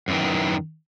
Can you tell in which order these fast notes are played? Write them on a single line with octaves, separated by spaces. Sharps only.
F#2 E3 D#3